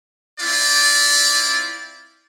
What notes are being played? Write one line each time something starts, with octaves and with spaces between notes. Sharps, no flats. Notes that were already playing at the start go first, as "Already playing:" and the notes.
C4 E4 F4 D5